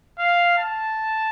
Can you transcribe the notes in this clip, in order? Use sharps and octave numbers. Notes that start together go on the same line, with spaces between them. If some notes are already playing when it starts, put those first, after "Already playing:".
F5
A5